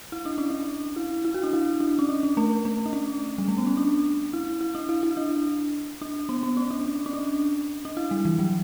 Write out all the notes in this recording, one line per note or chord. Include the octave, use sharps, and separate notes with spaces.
E4
D4
C#4
D4
E4
E4
F#4
D4
E4
D4
C#4
D4
C#4
A3
A3
D4
C#4
G3
A3
B3
C#4
D4
E4
E4
D4
E4
E4
D4
D4
B3
B3
C#4
D4
C#4
C#4
D4
D4
E4
G3
E3
F#3